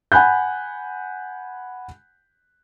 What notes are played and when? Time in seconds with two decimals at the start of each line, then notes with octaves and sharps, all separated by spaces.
0.12 F#5 G#5 B5 F#6 G6